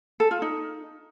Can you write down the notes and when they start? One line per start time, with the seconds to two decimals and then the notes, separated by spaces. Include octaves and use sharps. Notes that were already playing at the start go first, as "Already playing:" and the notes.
0.20 A4
0.31 F4
0.42 D#4